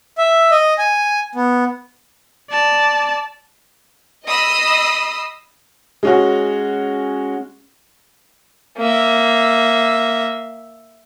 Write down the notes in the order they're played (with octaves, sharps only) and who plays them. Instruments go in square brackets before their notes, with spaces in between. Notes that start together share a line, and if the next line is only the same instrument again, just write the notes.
[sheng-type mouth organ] E5
D#5
G#5
B3
[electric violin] D5 A5
[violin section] D#5 B5 D#6 E6 C7
[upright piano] G#3 C#4 F#4
[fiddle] A#3 E5